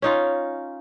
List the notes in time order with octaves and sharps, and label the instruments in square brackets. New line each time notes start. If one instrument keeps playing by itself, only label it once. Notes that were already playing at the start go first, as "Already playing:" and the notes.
[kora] C#4 D#4 F4